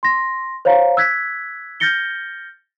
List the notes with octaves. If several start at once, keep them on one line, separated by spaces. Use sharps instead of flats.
C6 A#6
C5 C#5 F5 A#5
E6 F#6 G#6 B6
F6 G6 A6 A#6 C#7 G7